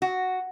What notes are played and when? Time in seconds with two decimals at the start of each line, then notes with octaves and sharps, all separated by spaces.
0.02 F#4